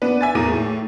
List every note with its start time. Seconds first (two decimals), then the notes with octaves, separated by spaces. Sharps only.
0.02 B3 D4 B4
0.21 E5 G#5 A6
0.35 E2 A2 G#4 A#4 D#7
0.53 A2